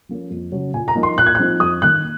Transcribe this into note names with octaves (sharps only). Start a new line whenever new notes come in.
F3 A#3 C#4
F2
C#3 F#3 C#4
A#2 G#5
A#5
F3 A#3 D#4
C6
A#2 F#6
G#6
F#6
F3 C4 D#4
F2 D#6
D#3 A#3 F#6